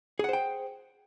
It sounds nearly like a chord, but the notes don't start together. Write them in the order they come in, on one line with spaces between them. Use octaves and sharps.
G#4 F#5 C5 G5